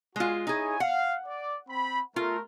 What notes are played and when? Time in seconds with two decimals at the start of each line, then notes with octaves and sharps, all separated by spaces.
0.16 G#3 F4 F#4 G#5
0.47 D#4 E4 G#4 C#5 G#5
0.80 F5 F#5
1.26 D5
1.69 C4 B5
2.16 A3 F4 A#4